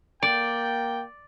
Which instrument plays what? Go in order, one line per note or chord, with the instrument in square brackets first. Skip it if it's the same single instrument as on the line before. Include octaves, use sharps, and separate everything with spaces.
[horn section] A#3 G5 [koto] D5